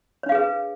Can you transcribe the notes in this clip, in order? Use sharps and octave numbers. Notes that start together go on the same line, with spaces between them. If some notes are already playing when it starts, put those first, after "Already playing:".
D4 G#4 B4 C#5 F5